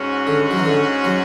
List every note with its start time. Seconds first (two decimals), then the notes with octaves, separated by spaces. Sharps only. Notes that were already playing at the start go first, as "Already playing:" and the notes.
Already playing: G#2 G#3 C#4 F#4
0.27 D3
0.51 F#3
0.58 E3
0.66 D3
1.04 F#3